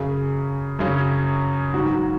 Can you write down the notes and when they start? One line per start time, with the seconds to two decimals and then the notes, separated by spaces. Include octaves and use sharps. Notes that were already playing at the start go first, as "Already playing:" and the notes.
Already playing: F#2 C#3 F#3 C#4 G#4
0.79 F#2 C#3 F#3 C#4
1.74 G#2 D#3 F#3 F#4